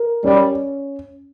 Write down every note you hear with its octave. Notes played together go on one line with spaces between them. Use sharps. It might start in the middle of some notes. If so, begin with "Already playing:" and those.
Already playing: A#4
G3 C#4